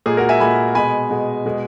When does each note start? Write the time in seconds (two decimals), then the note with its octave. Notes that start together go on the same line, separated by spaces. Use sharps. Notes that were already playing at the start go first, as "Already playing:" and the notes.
0.06 A#2 G#3 G#4
0.17 F#4 A#4
0.29 E5 G#5
0.40 A#2 G#3 G#5 B5
0.75 B2 G#3 G#5 B5
1.11 B2 G#3
1.46 B2 G#3